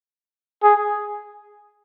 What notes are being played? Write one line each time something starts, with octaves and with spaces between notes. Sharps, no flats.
G#4